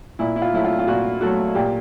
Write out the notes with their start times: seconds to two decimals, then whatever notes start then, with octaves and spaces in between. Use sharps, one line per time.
0.19 A#2 E4
0.36 E4
0.42 F4
0.53 F#3 A3 E4
0.65 F4
0.79 F4
0.88 A#2 F#4
1.21 F#3 A3 F#4
1.55 A#2 G4